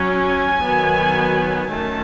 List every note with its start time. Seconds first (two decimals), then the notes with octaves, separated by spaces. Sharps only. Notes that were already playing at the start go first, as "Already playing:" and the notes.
Already playing: F#3 C#4
0.10 G#5
0.63 D#3 F#3 B3
1.69 D#3 F#3 A3 C#4 A5